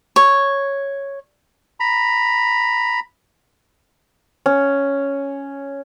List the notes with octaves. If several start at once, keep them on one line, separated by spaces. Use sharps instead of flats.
C#5
A#5 B5
C#4